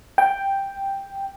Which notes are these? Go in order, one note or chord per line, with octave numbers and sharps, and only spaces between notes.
G5